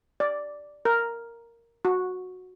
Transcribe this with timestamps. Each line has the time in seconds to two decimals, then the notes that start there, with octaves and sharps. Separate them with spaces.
0.20 D5
0.85 A#4
1.85 F#4